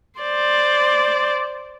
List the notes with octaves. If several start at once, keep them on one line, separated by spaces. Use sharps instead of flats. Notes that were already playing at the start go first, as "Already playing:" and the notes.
C5 D5